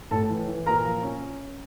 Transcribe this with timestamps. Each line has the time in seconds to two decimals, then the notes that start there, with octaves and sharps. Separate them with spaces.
0.11 A2 A4 A5
0.30 E3
0.47 E3
0.66 A#2 A#4 A#5
0.85 F3
1.03 C#4